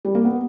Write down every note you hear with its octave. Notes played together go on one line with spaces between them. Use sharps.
G3
A#3
B3